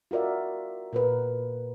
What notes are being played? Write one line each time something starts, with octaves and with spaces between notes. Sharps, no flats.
F4 F#4 A#4 D5 E5
A#2 A#4 B4